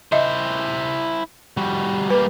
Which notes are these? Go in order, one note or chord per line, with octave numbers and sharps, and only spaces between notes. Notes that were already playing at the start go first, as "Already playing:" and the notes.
E4 C5 D#5 E5
G3 F#4
G3 A#3 B4